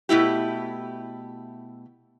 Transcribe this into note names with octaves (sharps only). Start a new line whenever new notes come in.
B2 A3 E4 G4